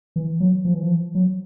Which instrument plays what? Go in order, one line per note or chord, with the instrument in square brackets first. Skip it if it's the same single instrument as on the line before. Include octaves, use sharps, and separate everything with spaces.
[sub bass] E3
F#3
F3
E3
F3
F#3